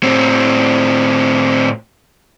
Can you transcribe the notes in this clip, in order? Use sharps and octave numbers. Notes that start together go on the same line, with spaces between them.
A2 C4